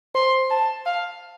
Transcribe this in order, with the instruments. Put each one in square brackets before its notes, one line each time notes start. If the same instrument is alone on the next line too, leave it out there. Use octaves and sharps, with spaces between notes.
[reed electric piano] C5 [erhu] C6
[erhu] A5
F5